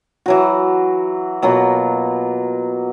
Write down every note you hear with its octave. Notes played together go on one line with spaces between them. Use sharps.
E3 F#3 F#4
B2 F#3 A#3 F4